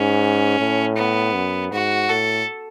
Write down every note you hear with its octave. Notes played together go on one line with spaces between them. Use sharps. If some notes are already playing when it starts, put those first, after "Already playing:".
Already playing: G#2 C#4
A2
B3
F#2
G#2 F#4
A2 A4